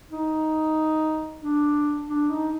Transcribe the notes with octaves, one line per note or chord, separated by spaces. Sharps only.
D#4
D4
D4
D#4